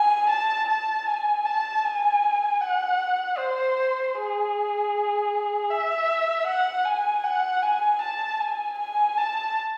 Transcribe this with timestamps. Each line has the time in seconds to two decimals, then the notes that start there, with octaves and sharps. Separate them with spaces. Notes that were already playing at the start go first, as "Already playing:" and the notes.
Already playing: G#5
0.30 A5
0.68 A5
1.07 G#5
1.45 A5
1.84 G#5
2.61 F#5
3.38 C5
4.15 G#4
5.70 E5
6.47 F#5
6.85 G#5
7.23 F#5
7.62 G#5
8.01 A5
8.40 G#5
8.78 G#5
9.17 A5